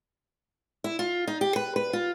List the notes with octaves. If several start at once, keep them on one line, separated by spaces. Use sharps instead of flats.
E4
F4
D#4
G4
B4
B4
F4